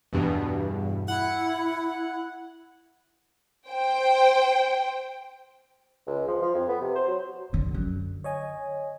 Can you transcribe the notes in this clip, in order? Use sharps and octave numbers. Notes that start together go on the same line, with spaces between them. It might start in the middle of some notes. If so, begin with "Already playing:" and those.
E2 G2 B2
E4 F#5
C5 G5
C#2
F3
F3
F2
B3
C3
C5
F#3
D3 F3
F#2 D3
C#5 D#5 G#5